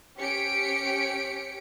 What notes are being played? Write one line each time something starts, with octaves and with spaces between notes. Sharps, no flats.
C#4 G4 B6 C#7 D7